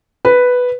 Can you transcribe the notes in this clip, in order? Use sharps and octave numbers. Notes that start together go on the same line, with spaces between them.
B4